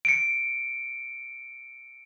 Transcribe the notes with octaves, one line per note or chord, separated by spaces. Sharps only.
C#7 D7